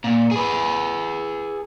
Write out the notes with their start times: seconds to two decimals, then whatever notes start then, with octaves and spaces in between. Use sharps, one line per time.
0.04 A#2
0.31 G#4 B4